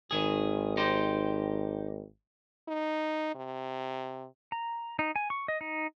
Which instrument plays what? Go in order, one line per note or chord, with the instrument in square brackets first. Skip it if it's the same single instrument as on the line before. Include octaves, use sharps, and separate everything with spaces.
[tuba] G#1 [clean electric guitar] D#3 G#4
[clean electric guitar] D#4 G4 C5
[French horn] D#4
C3
[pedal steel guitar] A#5
D#4
G#5
C#6
D#5
D#4